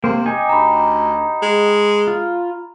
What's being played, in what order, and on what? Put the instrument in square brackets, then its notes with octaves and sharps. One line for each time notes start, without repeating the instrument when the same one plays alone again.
[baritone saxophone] C3 [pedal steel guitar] A#3 C5
[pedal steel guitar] D#4 G4 G#5
[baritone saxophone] D2 [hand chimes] A#5 B5
[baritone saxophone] G#3
[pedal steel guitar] F4